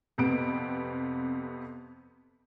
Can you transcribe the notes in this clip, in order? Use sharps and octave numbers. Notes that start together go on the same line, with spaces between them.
F2 C3 B3 D7